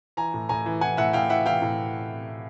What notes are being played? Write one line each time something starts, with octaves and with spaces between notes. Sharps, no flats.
E3 G#5 A#5
A2
A2 G#5 A#5
E3
E3 F#5 G#5
A2 E5 F#5
A2 F5 G5
E3 E5 F#5
E3 F5 G5
A2